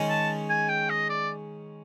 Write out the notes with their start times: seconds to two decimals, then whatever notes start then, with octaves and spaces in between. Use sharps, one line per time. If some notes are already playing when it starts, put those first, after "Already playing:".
Already playing: D#3 G#3 C#4
0.10 A5
0.50 G#5
0.69 G5
0.90 D#5
1.10 D5